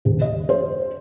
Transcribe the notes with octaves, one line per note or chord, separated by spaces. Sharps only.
D#1
D#5
C5